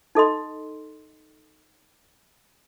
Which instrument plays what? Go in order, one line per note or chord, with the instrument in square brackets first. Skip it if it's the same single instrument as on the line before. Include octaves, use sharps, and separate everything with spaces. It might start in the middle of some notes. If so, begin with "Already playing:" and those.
[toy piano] D#4 A4 D#5 C6